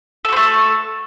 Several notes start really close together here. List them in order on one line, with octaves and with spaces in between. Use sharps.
A4 F#4 C4 A3